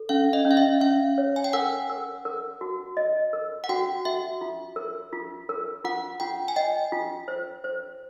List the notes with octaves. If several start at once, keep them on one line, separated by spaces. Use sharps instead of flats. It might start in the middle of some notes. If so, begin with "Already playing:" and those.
Already playing: A4
C#4 F5
D#5
C#4
F5
E5
C#4 F5
C#5
G#5
G5
A#4 F#5
A#4
A#4
F#4
D#5
A#4
F#5
F#4 G5
F#4 E5
F4
A#4
F4
A#4
F4 F#5
F4 G5
G#5
D#5 G5
F4
C5
C5